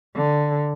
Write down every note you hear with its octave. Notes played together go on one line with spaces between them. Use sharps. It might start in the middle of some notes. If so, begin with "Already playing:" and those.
D3